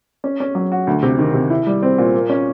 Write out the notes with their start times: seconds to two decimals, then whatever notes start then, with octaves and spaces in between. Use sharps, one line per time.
0.24 C#4
0.40 C#4
0.55 F#3
0.72 F#4
0.87 D2
1.02 C3
1.19 D#3
1.34 C3
1.50 E4
1.66 G3
1.83 C4
1.98 A#2
2.14 A#3
2.30 C#4